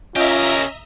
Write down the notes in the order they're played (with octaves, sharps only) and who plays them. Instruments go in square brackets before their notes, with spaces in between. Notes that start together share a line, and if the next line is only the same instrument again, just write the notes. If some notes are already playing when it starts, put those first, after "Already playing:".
[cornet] C#4 [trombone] F4 [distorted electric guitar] G4 A#4 [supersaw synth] D#5 E5 A#5